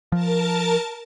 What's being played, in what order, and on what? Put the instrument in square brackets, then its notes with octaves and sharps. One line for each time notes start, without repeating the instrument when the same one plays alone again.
[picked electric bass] F3 [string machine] A#4 A5 A6